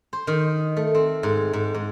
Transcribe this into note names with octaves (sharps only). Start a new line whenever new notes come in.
C5
D#3
A3
C4
G#2
G#2
G#2